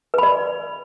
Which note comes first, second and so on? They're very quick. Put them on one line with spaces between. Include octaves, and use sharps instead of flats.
B4 B5 D5